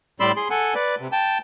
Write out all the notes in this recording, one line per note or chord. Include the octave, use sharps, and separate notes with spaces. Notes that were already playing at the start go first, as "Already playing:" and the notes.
A2 G3 D5 B5 C6 E6
G#4 C6
A4 F#5 G#5
B4 D5
C3
G5 A5